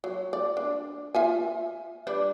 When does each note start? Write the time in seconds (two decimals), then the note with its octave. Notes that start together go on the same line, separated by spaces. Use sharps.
0.04 F#3
0.33 D5
0.57 D4
1.15 F4 E5 G#5
2.07 G3 D4 B4